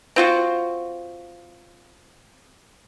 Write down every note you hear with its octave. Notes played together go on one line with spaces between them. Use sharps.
C4 F4 F#4